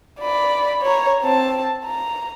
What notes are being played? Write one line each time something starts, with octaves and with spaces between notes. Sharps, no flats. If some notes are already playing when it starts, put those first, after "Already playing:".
D5 B5
C#5 A#5
C4 A5
A#5